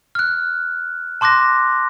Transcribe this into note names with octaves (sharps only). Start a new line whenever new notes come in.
F6 F#6
A5 C6 D6 F#6 A#6